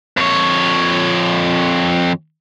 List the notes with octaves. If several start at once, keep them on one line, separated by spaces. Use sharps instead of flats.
F2 C#5